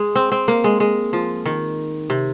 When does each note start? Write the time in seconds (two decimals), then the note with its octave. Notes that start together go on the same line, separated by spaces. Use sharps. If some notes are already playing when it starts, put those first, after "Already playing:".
Already playing: G#3
0.15 C4
0.32 C4
0.48 A#3
0.64 G#3
0.80 G#3
1.13 F3
1.45 D#3
2.10 C3